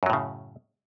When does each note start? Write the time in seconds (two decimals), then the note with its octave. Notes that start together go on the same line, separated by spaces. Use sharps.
0.03 F#2
0.06 F#3
0.10 A2
0.13 C#3